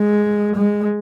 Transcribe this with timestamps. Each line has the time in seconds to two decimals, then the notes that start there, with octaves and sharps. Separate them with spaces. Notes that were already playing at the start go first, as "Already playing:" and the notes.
Already playing: G#3
0.56 G#3